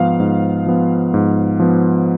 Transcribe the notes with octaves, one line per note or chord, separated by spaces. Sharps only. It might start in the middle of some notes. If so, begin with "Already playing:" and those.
Already playing: G#2 F3 B3 F5
G#2
F3 B3
G#2
F3 B3